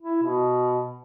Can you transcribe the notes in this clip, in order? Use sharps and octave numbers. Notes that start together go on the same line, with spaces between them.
E4
B2